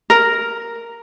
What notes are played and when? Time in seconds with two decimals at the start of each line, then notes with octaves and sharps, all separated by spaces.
0.10 A#4